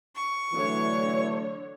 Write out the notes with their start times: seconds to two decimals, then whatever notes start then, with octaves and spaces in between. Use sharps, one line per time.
0.16 C#6
0.53 D3 E3 F#3 A3 C#5